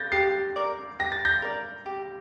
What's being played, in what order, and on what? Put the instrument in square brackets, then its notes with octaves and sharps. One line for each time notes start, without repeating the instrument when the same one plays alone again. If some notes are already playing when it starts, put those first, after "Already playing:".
Already playing: [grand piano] G6 A6 A#6
[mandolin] G4 [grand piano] A6 C7
[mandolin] A#4 D5
[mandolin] G4 [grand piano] A#6
[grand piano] A6
G6 A#6
[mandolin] A#4 D5
G4